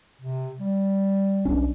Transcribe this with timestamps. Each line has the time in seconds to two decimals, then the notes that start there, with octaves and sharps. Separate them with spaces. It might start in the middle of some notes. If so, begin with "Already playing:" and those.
0.22 C3
0.60 G3
1.45 B1 C#4 D4